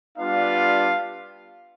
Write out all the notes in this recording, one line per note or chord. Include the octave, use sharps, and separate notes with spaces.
G3 B3 D4 F4 F5